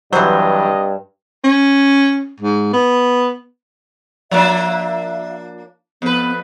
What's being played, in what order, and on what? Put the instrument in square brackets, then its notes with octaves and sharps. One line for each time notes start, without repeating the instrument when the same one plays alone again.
[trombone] G2 [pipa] C3 C5 [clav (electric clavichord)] E3 F#3 [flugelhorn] D#5
[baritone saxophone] C#4
G#2
B3
[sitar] F3 A#3 D4 [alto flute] E5
[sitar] F2 B4 [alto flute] B3